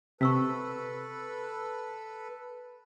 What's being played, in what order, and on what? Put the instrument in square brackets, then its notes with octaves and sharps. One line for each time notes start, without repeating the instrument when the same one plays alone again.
[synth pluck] C3 [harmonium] A4 B4 [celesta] C#6 E6 B6